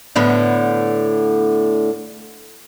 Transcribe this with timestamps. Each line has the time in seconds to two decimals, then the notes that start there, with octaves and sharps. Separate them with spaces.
0.16 A2 D3 B3